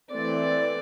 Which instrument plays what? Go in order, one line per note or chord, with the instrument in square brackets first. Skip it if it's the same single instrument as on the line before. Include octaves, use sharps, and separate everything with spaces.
[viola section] E3 A3 C4 D5